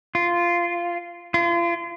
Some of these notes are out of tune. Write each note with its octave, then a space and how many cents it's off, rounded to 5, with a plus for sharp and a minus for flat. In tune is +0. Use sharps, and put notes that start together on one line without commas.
F4 -10
F4 -35